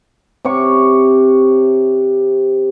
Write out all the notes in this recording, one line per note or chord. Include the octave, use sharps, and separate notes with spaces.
C3 G4 C#5 C#6